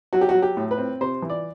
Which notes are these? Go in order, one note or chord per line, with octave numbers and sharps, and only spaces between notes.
F#3 F#4
G4
F#4
F#3
G4
A2
B4
C4
C3 C5
E3
D5